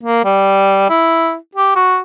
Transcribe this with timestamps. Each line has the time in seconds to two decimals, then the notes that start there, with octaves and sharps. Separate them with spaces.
0.03 A#3
0.24 G3
0.90 E4
1.55 G4
1.76 F#4